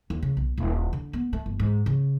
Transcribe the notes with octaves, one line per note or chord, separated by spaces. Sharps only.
D#2
C#3
B1
D#1
D3
B3
A3
G1
G#2
C#3